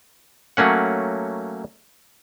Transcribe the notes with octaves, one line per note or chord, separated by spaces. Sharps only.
F#3 A3 A#3 C#4 F#5